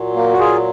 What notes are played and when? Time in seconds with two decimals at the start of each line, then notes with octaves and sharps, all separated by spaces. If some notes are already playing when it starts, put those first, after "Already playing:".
Already playing: A#2 F#3
0.15 A#3
0.32 F#4
0.40 F4 G#4